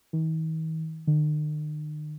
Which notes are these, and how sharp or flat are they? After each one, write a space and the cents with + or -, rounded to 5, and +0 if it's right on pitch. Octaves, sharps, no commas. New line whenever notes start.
D#3 +45
D#3 -45